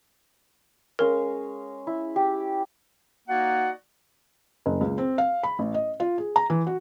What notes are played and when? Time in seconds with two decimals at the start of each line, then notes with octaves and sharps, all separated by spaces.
0.99 G#3 C#4 A#4 F5
1.87 E4
2.16 G4
3.28 A#3 D#4 F#4 D5 F#5
4.66 F#1
4.81 C#2
4.98 C4
5.18 F5
5.43 B5
5.59 A1
5.74 D#5
6.00 F4
6.18 G#4
6.36 A#5
6.50 E3
6.67 F#4